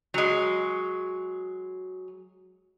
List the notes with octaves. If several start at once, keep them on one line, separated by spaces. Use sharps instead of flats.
F#3 G#3